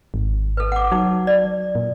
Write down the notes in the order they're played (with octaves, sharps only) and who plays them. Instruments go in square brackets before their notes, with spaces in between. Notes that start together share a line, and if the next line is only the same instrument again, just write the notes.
[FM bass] G#1
[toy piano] A4 B4
F#5 D6
[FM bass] F#3 [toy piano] D#4
[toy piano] D5
[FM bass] A#2